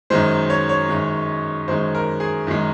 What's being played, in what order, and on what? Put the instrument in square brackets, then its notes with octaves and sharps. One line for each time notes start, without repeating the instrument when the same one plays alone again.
[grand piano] F#2 D#3 G#3 C5
C#5
C#5
F#2 D#3 G#3
F#2 D#3 G#3 C5
A#4
G#4
F#2 D#3 G#3